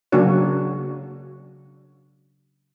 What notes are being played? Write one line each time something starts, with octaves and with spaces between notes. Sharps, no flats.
C#3 F#3 A#3 D4 F#4 C#5